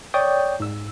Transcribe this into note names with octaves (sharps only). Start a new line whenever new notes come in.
C#5 D5 G5 C#6 D#6 G6
G#2 E6